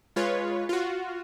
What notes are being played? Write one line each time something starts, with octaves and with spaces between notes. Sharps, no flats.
G#3 F4 B4 C#5
F4 F#4